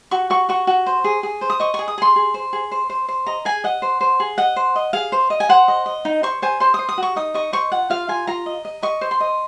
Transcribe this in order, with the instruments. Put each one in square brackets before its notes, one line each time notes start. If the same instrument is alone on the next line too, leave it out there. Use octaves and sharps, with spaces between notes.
[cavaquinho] F#4 C#6
F#4 C#6
F#4 C#6
F#4
C5
G#4
G#4
C5
D#6
D#5 C#6
G#4 C#6
D#6
G#4 C6
G#4
C5
G#4
C5
C5
C5
D#5 A#5
G#4 G#5
D#5 F#5
C5
C5
G#4
D#5 F#5
C5
D#5
G#4 F5
C5
D#5
G#5
C5 F#5
D#5
D#5
D#4
C5 C#6
C5 G#5
C5 C6
C5 D#6
D#6
F#4 C#6
D#4 D#6
D#5 C#6
C5 C#6
F4 F#5
F4 F5
F4 G#5
F4 A#5
D#5
D#5
D#5 C#6
C5
C6
D#5